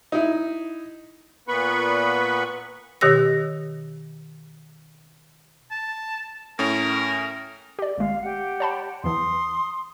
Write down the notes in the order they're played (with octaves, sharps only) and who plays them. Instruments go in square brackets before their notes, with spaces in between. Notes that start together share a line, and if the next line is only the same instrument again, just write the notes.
[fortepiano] D#4 E4
[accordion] A#2 B3 B4 B5 C#6
[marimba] B2 D#3 G4 C#5 E6 A#6
[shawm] A5
[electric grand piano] A2 C#4 [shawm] A#4
[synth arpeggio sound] G4 D5
[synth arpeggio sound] G#1 G#3 [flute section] F5
[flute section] G4 F#5
[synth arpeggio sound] C#5 A5 B5
[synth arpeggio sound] E2 E3 [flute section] C6 D#6